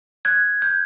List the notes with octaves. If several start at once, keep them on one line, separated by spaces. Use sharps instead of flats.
F#6 G#6
G6